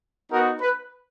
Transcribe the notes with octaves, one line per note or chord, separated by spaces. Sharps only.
B3 D#4 F#4 A#4
B4